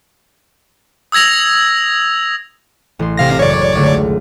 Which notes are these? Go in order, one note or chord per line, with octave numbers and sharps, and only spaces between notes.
D#6 E6 G#6 A#6 F7
A1 C6
C3 F5 A#6
F#1 C#5 D5 C#6
C#2 D3 A3